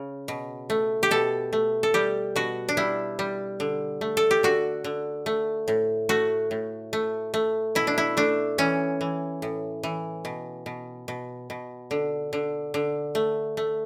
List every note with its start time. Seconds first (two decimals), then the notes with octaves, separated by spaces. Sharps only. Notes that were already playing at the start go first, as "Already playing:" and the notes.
Already playing: C#3
0.28 B2
0.70 A3
1.03 G4
1.11 B2 A4
1.53 A3
1.83 A4
1.94 G3 G4
2.36 B2 F#4
2.69 D4
2.77 G3 E4
3.19 G3
3.60 D3
4.01 A3
4.17 A4
4.31 G4
4.43 D3 F#4
4.84 D3
5.26 A3
5.68 A2
6.09 A3 F#4
6.51 A2
6.93 A3
7.34 A3
7.75 B2 E4
7.87 D4
7.98 E4
8.17 A3 D4
8.58 E3 C#4
9.01 E3
9.42 A2
9.83 E3
10.25 B2
10.66 B2
11.08 B2
11.50 B2
11.91 D3
12.33 D3
12.74 D3
13.15 A3
13.57 A3